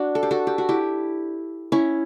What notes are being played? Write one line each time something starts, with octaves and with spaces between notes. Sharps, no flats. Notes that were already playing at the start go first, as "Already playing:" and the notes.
Already playing: D4 F#4
A4
G4
F#4 A4
G4
F#4
E4 G4
C#4 E4